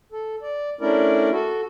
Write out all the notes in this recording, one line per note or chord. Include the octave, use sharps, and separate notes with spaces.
A4
D5
A3 C#4 D4 E4 A#4 D5
F#4 A4